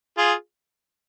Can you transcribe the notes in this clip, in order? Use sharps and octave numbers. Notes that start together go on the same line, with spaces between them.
F4 G#4